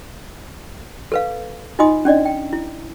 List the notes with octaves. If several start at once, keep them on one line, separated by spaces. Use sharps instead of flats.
A4 B4 F5
D#4 F4 D#5 G#5 C6 D#6
C#4 D4 D5 D#5
G5
E4